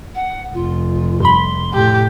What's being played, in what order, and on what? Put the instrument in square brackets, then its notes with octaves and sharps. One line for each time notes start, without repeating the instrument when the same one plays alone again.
[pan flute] F#5
[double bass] F1 [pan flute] F4
[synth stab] G2 B5 [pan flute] C6
[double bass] A2 [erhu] G4